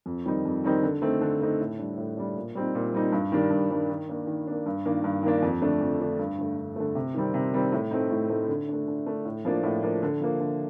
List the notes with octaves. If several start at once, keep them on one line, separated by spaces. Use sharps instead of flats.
F2
D#3 G3 C4 D#4
F2
D#3 G3 C4 D#4
D3
A3 C4 D#4
D3
A3 C4 D#4
A2
G3 D4
A2
G3 D4
A#2
G3 C4 D#4
A#2
G3 C4 D#4
G2
D#3 G3 D4
G2
D#3 G3 D4
D#3
A#3 D4
D#3
A#3 D4
G2
D#3 A#3 D4
G2
D#3 A#3 D4
F2
D3 A3 D4
F2
D3 A3 D4
G2
D3 A3
G2
D3 A3
C3
D#3 G3 C4
C3
D#3 G3 C4
A2
A3 C4 D#4
A2
A3 C4 D#4
D3
A3 D4
D3
A3 D4
A2
F3 A#3 D4
A2
F3 A#3 D4
D3
F3 A#3
D3